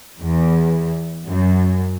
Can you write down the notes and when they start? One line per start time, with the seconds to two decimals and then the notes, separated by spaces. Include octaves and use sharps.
0.20 E2
1.27 F#2